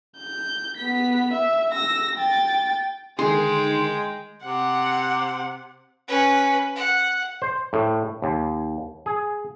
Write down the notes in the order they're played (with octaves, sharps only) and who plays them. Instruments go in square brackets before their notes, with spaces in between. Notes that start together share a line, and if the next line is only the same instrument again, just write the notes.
[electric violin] G6
B3 B6
E5
E6 A#6
G5 A6
[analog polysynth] D3 D#3 [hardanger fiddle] G#3 G5 [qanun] G#4 [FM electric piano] C6
[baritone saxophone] C3 [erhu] F#5
[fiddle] C#4 B4
F#5
[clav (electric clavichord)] C5
A2
D#2
G#4